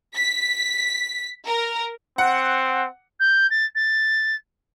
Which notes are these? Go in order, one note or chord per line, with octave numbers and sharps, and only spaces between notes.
B6
A#4
C4 F#5
G6
A6
A6